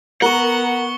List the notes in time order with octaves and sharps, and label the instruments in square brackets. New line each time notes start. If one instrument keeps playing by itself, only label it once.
[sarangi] B3 [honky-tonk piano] A#4 [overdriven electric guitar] F#5 [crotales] C#6 C#7 G7